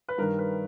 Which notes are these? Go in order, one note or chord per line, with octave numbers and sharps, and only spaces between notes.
B4
G2 D#3 A#4
B4